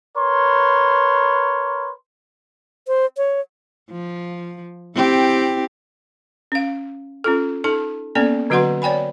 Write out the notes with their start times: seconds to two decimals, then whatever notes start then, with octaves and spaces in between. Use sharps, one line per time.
0.17 A#4 B4 C#5 C6
2.88 C5
3.17 C#5
3.91 F3
4.95 C4 E4 G4
6.52 C#4 F5
7.24 C#4 F4 A4
7.64 D#4 A4 A5
8.15 A#3 B3 C#4 A4 D5 G5
8.50 D3 F#3 F#4 B4 F#5 C6
8.82 C#5 D5 G5 G#5 B5